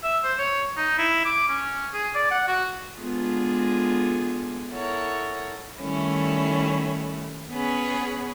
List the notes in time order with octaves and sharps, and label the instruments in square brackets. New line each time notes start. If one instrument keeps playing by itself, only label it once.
[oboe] E5
C5
C#5
D#4
E4
D6
C#4
G#4
D5
F#5
F#4
[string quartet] G#3 B3 D4 F4 G#4 A4
E4 A4 A#4 C#5 F#5
D#3 G3 A3 C#4 E4
B3 C#4 G#4 B4